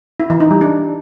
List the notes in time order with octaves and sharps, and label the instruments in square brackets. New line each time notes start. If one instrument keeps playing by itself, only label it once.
[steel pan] E4
E3
D#4
G3
D4